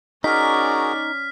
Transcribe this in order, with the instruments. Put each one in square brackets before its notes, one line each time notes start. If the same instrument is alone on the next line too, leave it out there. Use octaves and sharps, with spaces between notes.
[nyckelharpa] C#4 D5 [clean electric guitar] D#4 [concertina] F#4 G#4 A#4 [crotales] F6 B6